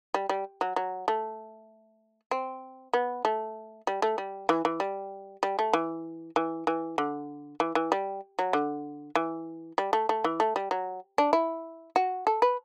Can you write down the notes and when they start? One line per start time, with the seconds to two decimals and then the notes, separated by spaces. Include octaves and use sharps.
0.14 G3
0.29 G3
0.61 F#3
0.76 F#3
1.08 A3
2.31 C4
2.94 B3
3.25 A3
3.87 G3
4.02 A3
4.18 G3
4.49 E3
4.65 E3
4.80 G3
5.43 G3
5.59 A3
5.73 E3
6.36 E3
6.67 E3
6.98 D3
7.60 E3
7.75 E3
7.92 G3
8.39 F#3
8.53 D3
9.16 E3
9.78 G3
9.93 A3
10.09 A3
10.24 E3
10.40 A3
10.56 G3
10.71 F#3
11.18 D4
11.33 E4
11.96 F#4
12.27 A4
12.42 B4